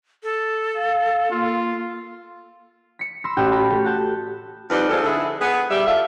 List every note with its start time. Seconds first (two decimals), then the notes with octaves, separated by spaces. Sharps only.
0.23 A4
0.75 F5
1.31 A#3 F4
2.99 B6 C#7
3.24 B5 C6 E6 A#6
3.37 A1 F#4 G5 E7
3.51 A5 B5 F6 A#6 B6
3.70 A3 G4 A4
3.84 F#4 F#5 A5 G6 E7
4.69 F2 G3 D#4 B4
4.89 F2 G#2 G#4 A4
5.03 D3 E4 G#4 A4
5.41 B3 G#4
5.70 G3 E5
5.86 F4 A4 E5 F5